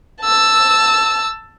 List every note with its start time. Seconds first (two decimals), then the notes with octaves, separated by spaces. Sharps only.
0.22 A5 E6